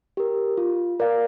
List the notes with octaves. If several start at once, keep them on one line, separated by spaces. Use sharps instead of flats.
G4 A#4
F4
A#4 D5 F5